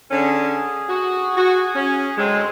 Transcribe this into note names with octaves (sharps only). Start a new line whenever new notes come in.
D3 C#4 G#4
F#4
F#4
C#4
D2 F#3 G#3 C4